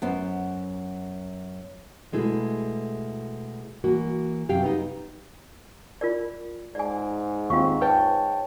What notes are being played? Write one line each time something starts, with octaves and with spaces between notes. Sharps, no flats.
F#2 B3 C5
B2 G#3 A3 E4
E3 A#3 F#4
F#2 C3 G4 F5 G5
B3 D#4
F4 A#4 D5
G#2 D5 G#5
D#2 C4 F4 F5 C#6
B4 C#5 G5 A5